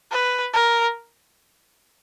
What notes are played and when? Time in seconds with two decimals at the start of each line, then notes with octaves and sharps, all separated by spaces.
0.11 B4
0.53 A#4